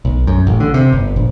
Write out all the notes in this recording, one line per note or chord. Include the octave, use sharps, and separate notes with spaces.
B1
F#2
A1
D3
C3
G1
A#1